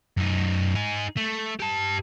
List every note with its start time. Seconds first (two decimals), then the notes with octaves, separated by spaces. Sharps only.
0.17 F#2 D#4
0.75 D#4 G#4
1.17 A3
1.60 G4 A5